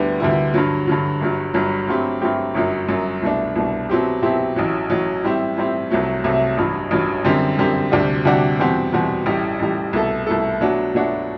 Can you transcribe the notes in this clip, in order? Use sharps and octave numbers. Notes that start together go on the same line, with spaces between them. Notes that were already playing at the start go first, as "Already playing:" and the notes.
Already playing: D2 D3 G3 B3 E4
D2 D3 G3 B3 E4
G2 D3 F#3
G2 D3 F#3
G1 G2 F#3
G1 G2 F#3
G2 F#3 A3 C4 G4
G2 F#3 A3 C4 G4
G1 F#2 F#3
G1 F#2 F#3
C2 B2 A3 D4
C2 B2 A3 D4
B2 F#3 C4 E4 G4
B2 F#3 C4 E4 G4
A1 A2 F#3
A1 A2 F#3
A2 G3 C4 E4
A2 G3 C4 E4
C2 C3 F#3 A3
C2 C3 F#3 A3
A1 G2 F#3
A1 G2 F#3
F#2 D3 G3 C4
F#2 D3 G3 C4
D2 C3 G3 D4 F#4
D2 C3 G3 D4 F#4
E2 B2 G3 C4 F#4
E2 B2 G3 C4 F#4
A1 A2 G3
A1 A2 G3
C2 B2 A3 E4 A4
C2 B2 A3 E4 A4
B2 F#3 A3 D4 F#4
B2 F#3 A3 D4 F#4